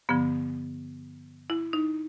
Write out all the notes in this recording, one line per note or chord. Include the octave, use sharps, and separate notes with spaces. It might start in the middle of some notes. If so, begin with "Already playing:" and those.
G2 D3 F3 B3
E4
D#4